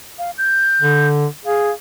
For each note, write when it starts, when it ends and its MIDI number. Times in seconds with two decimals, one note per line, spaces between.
0.19 0.31 77
0.38 1.08 91
0.82 1.26 50
1.45 1.71 68
1.45 1.73 77